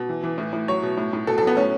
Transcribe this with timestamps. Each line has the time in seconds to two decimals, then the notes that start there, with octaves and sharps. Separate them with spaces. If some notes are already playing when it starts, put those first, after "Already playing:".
Already playing: B2
0.09 E3
0.23 E3
0.38 A2
0.53 A2
0.68 F#3 C#5
0.82 B2
0.97 A2
1.13 A2
1.27 B2 A4
1.38 A4
1.42 F#3
1.47 B3
1.57 A2 C#4